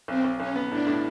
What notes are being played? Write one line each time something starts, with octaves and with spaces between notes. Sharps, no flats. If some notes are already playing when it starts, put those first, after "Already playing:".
B1 C4
B1
B1 C#4
B3
A2 D4
A2